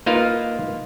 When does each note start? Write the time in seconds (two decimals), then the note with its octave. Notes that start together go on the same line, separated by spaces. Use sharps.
0.06 A#3 D#4 F4 A#4 B4 F5